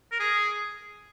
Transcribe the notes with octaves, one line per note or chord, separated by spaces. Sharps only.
A#4
G#4